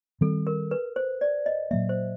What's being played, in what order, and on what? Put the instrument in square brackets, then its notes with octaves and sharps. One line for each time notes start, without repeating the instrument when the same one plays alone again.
[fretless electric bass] D#3 G3 C4 [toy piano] A4
[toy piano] A#4
B4
C5
D5
D#5
[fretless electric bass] A#2 F#3 A#3 [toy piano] E5
[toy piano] C5